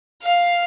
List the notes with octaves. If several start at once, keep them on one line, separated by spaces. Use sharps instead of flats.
F5